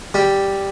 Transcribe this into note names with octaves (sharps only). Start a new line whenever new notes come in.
G3